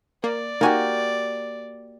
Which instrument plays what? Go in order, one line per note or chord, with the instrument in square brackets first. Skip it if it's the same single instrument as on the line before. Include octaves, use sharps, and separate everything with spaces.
[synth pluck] A#3 [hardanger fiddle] D5
[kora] A#3 F#4 G4 [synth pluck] D#4 G#5